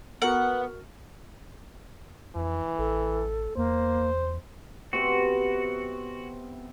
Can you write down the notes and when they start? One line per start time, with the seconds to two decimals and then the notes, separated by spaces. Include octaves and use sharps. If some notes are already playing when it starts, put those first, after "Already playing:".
0.22 B3 F#4 A#4 F#5
2.35 F2 E3
2.78 A1 A4
3.57 E2 A#3 C5
4.93 C3 B3 C4 F#4